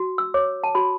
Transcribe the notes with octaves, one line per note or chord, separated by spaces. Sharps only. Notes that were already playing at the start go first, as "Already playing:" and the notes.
Already playing: F#4
E6
C#5 D6
A5
F#4 B5